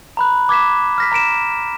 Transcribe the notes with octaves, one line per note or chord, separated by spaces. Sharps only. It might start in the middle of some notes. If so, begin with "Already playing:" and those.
A#5 B5 F#6
D6 G#6 B6 E7
F6 A#6 B6
A#5 B6 D7 E7